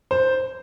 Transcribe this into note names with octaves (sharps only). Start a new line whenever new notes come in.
C5